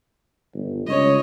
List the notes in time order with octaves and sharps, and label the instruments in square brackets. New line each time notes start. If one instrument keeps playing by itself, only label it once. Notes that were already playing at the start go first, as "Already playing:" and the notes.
[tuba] G1
[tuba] C#2 [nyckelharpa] C#5 D#5